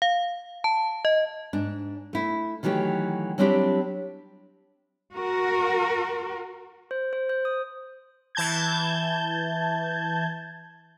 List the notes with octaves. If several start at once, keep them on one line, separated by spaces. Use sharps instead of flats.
F5
A5
D#5
G#2 D4
A3 E4
D#3 E3 F#3 A3 G4
F#3 G3 C4 D4 E4 G4
F#4 A#4
C5
C5
C5
D#6
E3 A5 G6 G#6